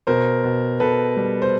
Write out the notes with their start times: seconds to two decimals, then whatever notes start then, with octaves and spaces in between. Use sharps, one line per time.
0.07 B2 A#4 C5
0.44 B2
0.80 B2 A4 B4
1.17 G3
1.42 C5